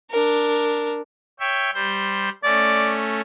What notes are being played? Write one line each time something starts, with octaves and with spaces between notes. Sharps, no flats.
D4 A#4
C#5 E5 G5
G3 C5 G6
A3 C#4 D5